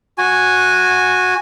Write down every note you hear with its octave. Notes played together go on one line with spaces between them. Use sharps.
F#4 G#5